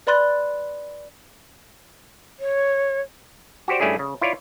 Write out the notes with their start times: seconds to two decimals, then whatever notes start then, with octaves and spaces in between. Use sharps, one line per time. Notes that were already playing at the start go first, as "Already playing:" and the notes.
0.07 B4 D5 B5 C6 F#6 A6
2.40 C#5
3.68 F#4 G4 C5 D5
3.80 G2 A3 C#4 E4 G#4 D5
3.99 C#3
4.22 E4 F4 C#5 D5